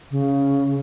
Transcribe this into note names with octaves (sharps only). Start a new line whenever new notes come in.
C#3